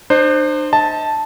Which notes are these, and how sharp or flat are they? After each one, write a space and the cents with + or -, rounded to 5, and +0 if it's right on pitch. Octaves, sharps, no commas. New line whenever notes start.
D4 +45 C5 +5
D#5 +35 A5 +0